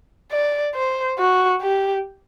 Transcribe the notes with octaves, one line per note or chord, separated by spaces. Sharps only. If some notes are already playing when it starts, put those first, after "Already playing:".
D5
C5
F#4
G4